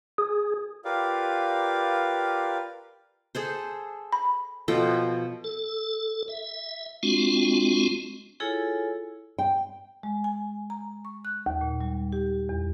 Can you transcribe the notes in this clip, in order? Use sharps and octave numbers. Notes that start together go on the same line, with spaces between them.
G#4
F4 G4 A#4 B4 D5 F5
G#4 A4 C5
B5
B2 F3 A4 G5
A4
E5
G#3 C4 D4 F4 F#4
E4 F4 G#4 A4 C#5 G#5
G5
G#3
G#5
A#5
C#6
F#6
D#2
A#2
G3
G4
E2